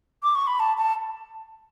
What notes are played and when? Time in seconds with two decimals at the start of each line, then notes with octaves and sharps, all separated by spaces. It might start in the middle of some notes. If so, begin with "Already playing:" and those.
0.23 D6
0.35 C#6
0.47 B5
0.59 A5
0.77 A5